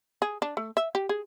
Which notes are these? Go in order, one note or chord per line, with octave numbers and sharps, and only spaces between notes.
G#4
D4
A3
E5
G4
G#4